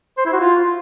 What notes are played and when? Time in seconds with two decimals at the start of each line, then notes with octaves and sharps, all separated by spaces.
0.18 C5
0.26 E4
0.33 F#4
0.41 F4